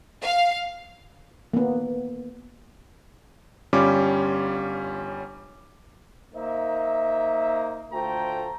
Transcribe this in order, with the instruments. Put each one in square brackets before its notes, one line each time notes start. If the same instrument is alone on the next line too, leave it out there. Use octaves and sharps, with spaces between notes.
[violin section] F5
[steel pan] A#3 B3
[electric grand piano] G1 G3 C#4 F4 D6
[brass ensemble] A#3 D#4 C5 E5
D2 A3 F4 C5 G5 A#5